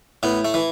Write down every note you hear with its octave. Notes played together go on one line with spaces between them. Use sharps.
A2 B3
A3
E3